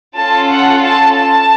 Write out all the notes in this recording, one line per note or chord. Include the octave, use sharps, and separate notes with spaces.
C#4 F4 A4 A5
F#5
A5
A5